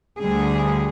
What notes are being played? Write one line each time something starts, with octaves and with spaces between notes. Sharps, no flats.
D2 D3 G3 G#4